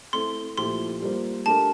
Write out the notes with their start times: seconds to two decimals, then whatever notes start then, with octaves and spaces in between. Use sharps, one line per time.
0.13 A3 C4 E4 A4 C5 C6
0.57 A#2 F3 A3 E4 G4 C6
1.02 G3 A#3 F4 C5
1.46 A3 D4 G4 A#4 A5